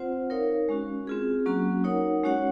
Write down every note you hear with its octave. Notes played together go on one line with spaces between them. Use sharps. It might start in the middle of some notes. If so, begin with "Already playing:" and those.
Already playing: C4 F4 C5 F#5
D#4 A#4 C#5 F5
G#3 C#4 F#4
C4 F4 G#4
F#3 A#3 C#4 F#4
D#4 A#4 C#5 F#5
G#3 C#4 F#4 C#5 F#5